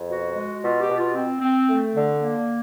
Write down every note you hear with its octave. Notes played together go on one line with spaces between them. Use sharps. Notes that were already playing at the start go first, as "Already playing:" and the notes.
Already playing: F2
B2 F#4
G#3
B2 F4
G4
B2
F4
C4
C4
A3
D3
A#3